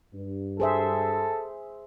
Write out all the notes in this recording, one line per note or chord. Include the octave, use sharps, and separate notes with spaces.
G2
G#4 A4 C5 E5